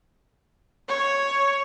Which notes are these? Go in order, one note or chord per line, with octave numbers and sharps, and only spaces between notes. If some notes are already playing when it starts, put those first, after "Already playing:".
C#5